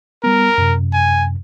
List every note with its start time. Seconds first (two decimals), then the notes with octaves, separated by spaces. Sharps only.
0.24 G3 B3 A#4
0.58 F#2 C3
0.93 G#5